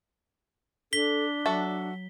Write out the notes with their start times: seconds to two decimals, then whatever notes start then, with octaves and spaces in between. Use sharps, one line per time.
0.93 D4 A4 B6 G7
1.46 F#3 F#4 A4 E5